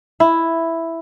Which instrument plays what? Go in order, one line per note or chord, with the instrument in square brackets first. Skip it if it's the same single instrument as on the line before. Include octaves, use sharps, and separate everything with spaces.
[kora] E4